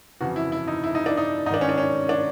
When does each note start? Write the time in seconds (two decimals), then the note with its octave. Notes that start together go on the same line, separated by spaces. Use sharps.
0.21 F2 C#3 E3 F#4
0.36 E4
0.52 E4
0.68 D#4
0.84 E4
0.95 D#4
1.06 D4
1.17 D#4
1.46 G#2 D#4
1.50 D#3 D4
1.61 C#4
1.69 D4
1.78 C#4
2.09 D4